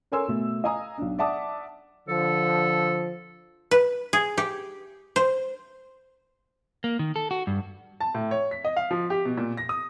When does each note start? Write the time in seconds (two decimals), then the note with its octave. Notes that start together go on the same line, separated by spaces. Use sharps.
0.12 A4 A#4 C#5 G#5 C6 E6
0.28 B2 A3
0.64 D#5 F5 G#5 A#5 D#6
0.98 B1 D4
1.18 D5 E5 F#5 A5 D6 D#6
2.08 D3 F3 A4
3.71 B4
4.13 G#4
4.38 G4
5.16 C5
6.84 A#3
6.99 D#3
7.16 A4
7.31 F#4
7.47 G2
8.00 A5
8.15 A2
8.31 C#5
8.51 B6
8.65 D#5
8.76 F5
8.91 F3
9.10 G4
9.25 B2
9.37 A#2
9.57 A#6
9.69 D#6